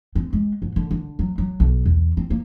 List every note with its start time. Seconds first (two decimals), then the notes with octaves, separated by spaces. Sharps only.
0.15 C4
0.33 G#3
0.62 G#2
0.76 D3
0.91 D3
1.19 F#3
1.38 F#3
1.60 B1
1.86 E2
2.17 C4
2.30 A#3